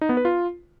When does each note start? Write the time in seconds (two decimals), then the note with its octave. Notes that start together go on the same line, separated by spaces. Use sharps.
0.01 D#4
0.09 B3
0.17 B4
0.25 F4